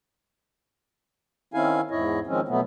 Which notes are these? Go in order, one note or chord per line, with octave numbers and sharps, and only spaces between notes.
D#3 C4 C#4 E4 F5 G#5
E2 G#2 E4 C#5 D#5
D#3 F3 G#3 C4 C#4
B2 F#3 A3 B3